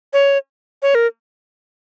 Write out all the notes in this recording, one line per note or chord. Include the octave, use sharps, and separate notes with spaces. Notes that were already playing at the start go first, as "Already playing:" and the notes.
C#5
C#5
A#4